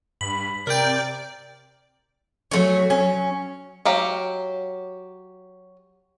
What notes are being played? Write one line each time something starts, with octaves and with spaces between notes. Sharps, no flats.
G2 B5
C3 A#4 D5 G5
F#3 A3 C#4
C#4
F#3 G4 F5